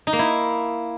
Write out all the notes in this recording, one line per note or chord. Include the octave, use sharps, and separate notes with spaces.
D#4
A#3
E4